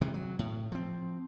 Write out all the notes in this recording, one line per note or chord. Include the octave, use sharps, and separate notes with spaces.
C3 D#3 E3 G#3
F#3
A2
F3 C4